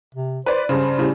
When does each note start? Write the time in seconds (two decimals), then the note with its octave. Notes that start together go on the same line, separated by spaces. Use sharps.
0.15 C3
0.46 B4 C5 D5
0.69 G2 C#3 C5
0.98 A2 C#3 G3